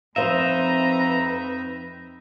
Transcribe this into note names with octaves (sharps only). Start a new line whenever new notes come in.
F2 C4 D#4 B4 C5 E5 F5 A#5